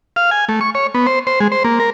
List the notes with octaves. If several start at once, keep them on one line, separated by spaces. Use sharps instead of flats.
F5
G#5
A3
C#6
C#5
B3
C5
C5
G#3
C5
A#3
A#4